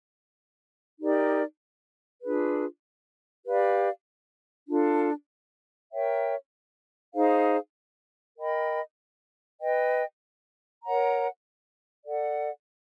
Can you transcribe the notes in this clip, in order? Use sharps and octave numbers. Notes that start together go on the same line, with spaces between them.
D#4 G4 A#4 D5
D4 F4 G#4 B4
G4 B4 D5 F5
D4 F4 A4
A#4 C#5 E5 G5
D#4 G#4 C5 F5
A#4 D#5 G5 B5
B4 D#5 G5
A#4 C#5 F#5 A#5
A4 D5 F#5